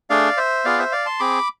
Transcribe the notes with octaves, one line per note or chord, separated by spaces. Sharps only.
A3 D4 G#4 D5 F5
C5 E5
B3 F4 G#4 D5 F5
C5 E5
D5 F5
A5 C6
C4 G#4 B5 D6